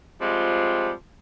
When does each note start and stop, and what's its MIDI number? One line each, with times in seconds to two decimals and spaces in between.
0.21 0.91 53
0.21 0.91 55
0.21 0.91 56
0.21 0.91 60
0.21 0.91 65